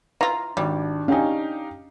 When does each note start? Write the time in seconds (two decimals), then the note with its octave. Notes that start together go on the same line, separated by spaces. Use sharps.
0.21 E3 F4 A#5
0.57 G#1 G3 D4
1.08 C#4 D#4 G4 F5